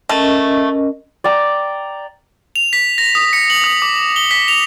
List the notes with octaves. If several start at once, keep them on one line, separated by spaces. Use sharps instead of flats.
A3 C#4 A#4 D#5
D5 G5 A#5
F7
B6
A#6
D#6
C#7
F#7
D#6
D6
G7
B6
F7